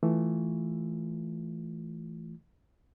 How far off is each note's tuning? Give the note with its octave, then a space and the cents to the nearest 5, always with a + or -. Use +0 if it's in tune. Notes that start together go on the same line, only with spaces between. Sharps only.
E3 +0 A3 +0 F4 +0